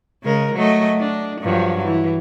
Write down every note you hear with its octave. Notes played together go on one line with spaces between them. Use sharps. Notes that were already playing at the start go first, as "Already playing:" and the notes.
C#3 G#3 A#4
F#3 A3 D#5
D4
G2 F3 F#3
E3